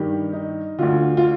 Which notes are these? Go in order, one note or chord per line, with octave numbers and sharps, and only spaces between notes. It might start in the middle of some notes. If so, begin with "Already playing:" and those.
Already playing: G2 D#3 G4
D#4
D2 D3 F4
F4